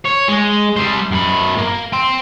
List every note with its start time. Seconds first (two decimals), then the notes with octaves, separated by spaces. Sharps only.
0.05 C#5
0.28 G#3
0.77 G3 C5
1.11 F#2 B5
1.58 A#3
1.93 G5 C6